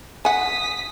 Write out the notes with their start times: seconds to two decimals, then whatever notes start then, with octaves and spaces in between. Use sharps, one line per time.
0.25 F#5 G#5 D#6 B6